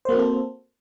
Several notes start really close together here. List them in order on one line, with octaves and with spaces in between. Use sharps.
C5 A#3 F#4 C4 A4